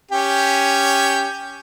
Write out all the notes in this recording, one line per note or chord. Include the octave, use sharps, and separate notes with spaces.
C#4 G4